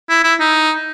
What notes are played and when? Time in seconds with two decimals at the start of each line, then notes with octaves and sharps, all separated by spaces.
0.10 E4
0.24 E4
0.40 D#4